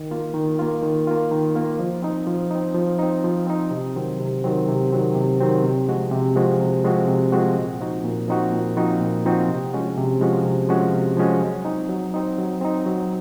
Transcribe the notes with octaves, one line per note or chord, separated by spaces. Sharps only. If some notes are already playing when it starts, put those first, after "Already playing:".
Already playing: D#3
A#3 F4
D#3
A#3 F4
D#3
A#3 F4
D#3
A#3 F4
F3
C4 D#4
F3
C4 D#4
F3
C4 D#4
F3
C4 D#4
C3
D#3 F#3 C4
C3
D#3 F#3 C4
C3
D#3 F#3 C4
C3
D#3 F#3 C4
C3
F3 G#3 C4 F#4
C3
F3 G#3 C4 F#4
C3
F3 G#3 C4 F#4
C3
F3 G#3 C4 F#4
A#2
F3 C4 D#4 F#4
A#2
F3 C4 D#4 F#4
A#2
F3 C4 D#4 F#4
A#2
F3 C4 D#4 F#4
C3
F3 G#3 C#4 F#4
C3
F3 G#3 C#4 F#4
C3
F3 G#3 C#4 F#4
C3
F3 G#3 C#4 F#4
F#3
C4 D#4
F#3
C4 D#4
F#3
C4 D#4
F#3